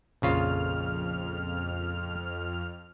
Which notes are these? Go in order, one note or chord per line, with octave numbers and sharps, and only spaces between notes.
A#1 F2 C#3 F4 F6